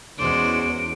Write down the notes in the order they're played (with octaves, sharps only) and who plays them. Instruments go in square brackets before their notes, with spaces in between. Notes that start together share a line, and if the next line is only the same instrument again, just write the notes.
[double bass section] E2 [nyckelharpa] G#3 D5 [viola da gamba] C#4 F#4 C5 [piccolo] D7